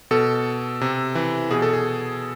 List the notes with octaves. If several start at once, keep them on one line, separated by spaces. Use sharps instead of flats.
B2 A4
C3
E3
B2 G#4
A4
G#4